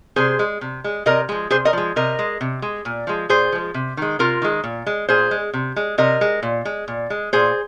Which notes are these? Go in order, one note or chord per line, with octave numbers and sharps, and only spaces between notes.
C3 G#4 C5
G#3
C3
G#3
C3 A#4 D#5
F3 G#3
C3 G#4 C5
A#4 D#5
F3 G#3
C3 A#4 D#5
G#3
C3
G#3
A#2
F3 G#3
A#2 G#4 C5
F3 G#3
C3
D#3 G#3
C3 F4 A#4
D#3 G#3
A#2
G#3
A#2 G#4 C5
G#3
C3
G#3
C3 A#4 D#5
G#3
A#2
G#3
A#2
G#3
A#2 G#4 C5